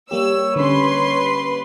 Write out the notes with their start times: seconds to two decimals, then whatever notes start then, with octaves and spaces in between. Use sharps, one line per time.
0.11 G3 A#3 G4 C#5 E6
0.56 D3 C#4 B4 C6